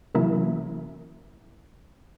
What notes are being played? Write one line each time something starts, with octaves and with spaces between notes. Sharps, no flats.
C3 E3 F#3 A#3 C#4 E4